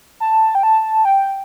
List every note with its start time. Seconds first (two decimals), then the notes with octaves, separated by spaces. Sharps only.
0.20 A5
0.55 G5
0.63 A5
1.05 G5